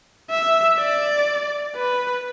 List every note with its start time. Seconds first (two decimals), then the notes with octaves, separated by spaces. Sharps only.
0.30 E5
0.78 D5
1.76 B4